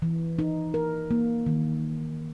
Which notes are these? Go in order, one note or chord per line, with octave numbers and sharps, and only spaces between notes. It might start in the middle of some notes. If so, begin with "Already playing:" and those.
E3
D#4
A#4
A#3
D#3